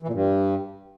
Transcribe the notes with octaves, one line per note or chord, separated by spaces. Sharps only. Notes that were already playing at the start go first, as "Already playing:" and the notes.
E3
A#2
G2